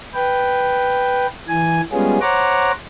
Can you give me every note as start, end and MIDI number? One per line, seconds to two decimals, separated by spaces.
0.14 1.27 71
0.14 1.27 79
1.48 1.81 52
1.48 1.81 80
1.93 2.18 55
1.93 2.18 56
1.93 2.18 59
1.93 2.18 61
1.93 2.18 65
1.93 2.18 68
2.21 2.71 72
2.21 2.71 73
2.21 2.71 78
2.21 2.71 82
2.21 2.71 86